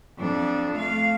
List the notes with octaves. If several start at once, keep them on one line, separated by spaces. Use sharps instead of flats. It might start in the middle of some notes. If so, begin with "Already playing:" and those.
F2 D4
A3 F5